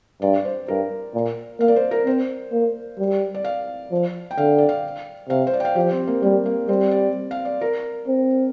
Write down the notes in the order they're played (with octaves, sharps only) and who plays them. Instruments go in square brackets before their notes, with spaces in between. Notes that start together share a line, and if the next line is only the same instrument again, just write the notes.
[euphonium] G2 [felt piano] D5
[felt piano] D5
C5
[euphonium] G2 [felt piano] A#4
[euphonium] A#2
[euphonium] A#3 [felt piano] F5
[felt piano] D5
C5
A#4
[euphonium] C4 [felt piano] C5
[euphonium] A#3
G3
[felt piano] D5
F5
[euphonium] F3
[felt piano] G5
[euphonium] D3 [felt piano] F5
[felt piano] D5
F5
[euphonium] C3 [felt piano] F5
[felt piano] C5
D5
G5
F5
[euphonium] F3 [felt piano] G4
[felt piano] C4
A#3
[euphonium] G3 [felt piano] A#3
[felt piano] A#3
[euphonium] G3 [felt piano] C4
[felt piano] D5
F5
D5
A#4
[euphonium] C4